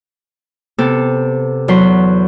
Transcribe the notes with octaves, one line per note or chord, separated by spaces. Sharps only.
C3 B3 G4 A4
E2 F#3 B4 C6